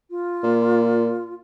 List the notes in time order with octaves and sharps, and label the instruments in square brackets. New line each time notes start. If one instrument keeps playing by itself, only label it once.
[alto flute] F4
[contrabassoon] A#2